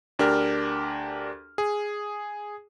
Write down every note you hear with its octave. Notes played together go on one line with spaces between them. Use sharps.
D2 D4 G4 A#4 F6
G#4